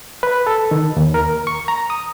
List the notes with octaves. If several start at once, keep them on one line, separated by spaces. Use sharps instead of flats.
B4
A4
D#3
D#2
A#4
C#6
A#5
D#6